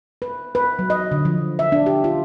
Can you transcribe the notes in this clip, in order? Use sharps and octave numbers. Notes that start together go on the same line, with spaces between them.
B4
B4
F#3
D#5
D3
F3
E5
D4
G4
F4